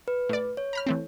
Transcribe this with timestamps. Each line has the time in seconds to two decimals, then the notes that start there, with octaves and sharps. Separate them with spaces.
0.08 B4
0.29 A2 D5
0.57 C#5
0.73 A#5 B5 F6
0.86 E3 A3 C4